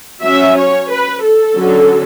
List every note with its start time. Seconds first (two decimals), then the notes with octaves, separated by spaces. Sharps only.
0.22 F#3 C#4 E5
0.57 C#5
0.90 B4
1.23 A4
1.56 D3 F#3 C#4